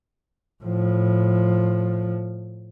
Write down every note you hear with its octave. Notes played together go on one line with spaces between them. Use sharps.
A2 F3